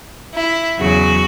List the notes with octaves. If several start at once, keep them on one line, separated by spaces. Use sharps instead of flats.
E4
E2 C#3 F#3 F#4